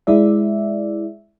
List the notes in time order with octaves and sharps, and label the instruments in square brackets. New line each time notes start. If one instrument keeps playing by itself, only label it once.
[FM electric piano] G#3 E4 D5 E5